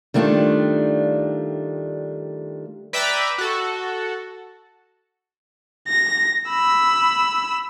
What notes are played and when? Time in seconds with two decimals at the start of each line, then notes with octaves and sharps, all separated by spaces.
0.14 D#3 G3 A3 D4 F4
2.93 B4 D5 E5 G5 A#5 B5
3.38 F#4 A4
5.88 A#6
6.49 B5 E6